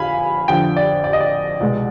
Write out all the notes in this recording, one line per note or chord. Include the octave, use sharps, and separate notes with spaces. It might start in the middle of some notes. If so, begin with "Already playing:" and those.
Already playing: F2 D3 F5 G#5 B5
F2 D3 F3 G5
D5
D5
D#5
D5
C2 B2 G#3